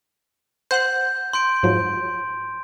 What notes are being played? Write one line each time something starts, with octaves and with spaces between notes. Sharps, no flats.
C5 F#5 F#6 G6
C6 G6 D7
G#2 F3 F#3